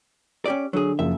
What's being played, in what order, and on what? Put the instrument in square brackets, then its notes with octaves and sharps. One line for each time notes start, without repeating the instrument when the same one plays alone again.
[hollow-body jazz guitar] C#4 G4 D5
[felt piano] D3 [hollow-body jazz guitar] F#3 G#4
[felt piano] F#1 F3 [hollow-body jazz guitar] E5